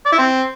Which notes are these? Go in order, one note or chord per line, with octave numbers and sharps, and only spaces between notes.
D5
E4
C4